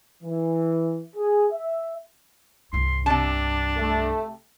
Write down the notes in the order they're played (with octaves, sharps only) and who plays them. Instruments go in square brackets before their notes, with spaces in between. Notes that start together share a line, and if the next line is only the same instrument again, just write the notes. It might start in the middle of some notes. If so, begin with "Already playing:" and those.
[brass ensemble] E3
G#4
E5
[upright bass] C2 G2 [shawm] C6
[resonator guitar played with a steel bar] C3 A5 [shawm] D4
[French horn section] A3